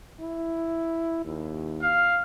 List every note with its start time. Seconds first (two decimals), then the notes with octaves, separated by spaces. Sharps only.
0.20 E4
1.25 D#2
1.82 F5